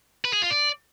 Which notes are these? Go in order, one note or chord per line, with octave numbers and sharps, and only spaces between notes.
B4
G#4
F4
D5